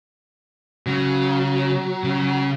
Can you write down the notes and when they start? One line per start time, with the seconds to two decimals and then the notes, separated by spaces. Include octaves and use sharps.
0.87 C#3 F#3
2.04 C#3